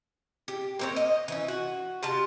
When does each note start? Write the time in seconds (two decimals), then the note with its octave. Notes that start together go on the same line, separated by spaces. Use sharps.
0.48 G4
0.79 A#3 C4 C#5
0.96 D#5
1.28 E3 C#4
1.48 F#4
2.03 C3 F4 A5